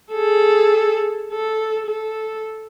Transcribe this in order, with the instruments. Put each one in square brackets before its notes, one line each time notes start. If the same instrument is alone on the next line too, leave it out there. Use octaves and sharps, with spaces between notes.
[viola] G#4 A4
A4
A4